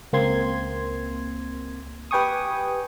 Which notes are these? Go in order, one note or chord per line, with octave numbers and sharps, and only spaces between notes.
C#2 A#3 C4 C6 G#6
G4 B4 G5 G#5 C#6 D#6